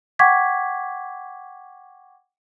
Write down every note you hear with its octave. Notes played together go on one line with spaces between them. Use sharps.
F#5 G5 C#6 D6 G#6 B6